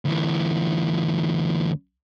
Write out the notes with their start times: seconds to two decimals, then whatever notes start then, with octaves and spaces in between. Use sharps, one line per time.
0.05 D2 E3